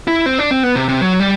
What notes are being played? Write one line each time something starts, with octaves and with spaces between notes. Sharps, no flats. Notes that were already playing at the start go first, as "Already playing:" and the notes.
E4
C4
D4
C4
B3
C3
C3
F#3
G3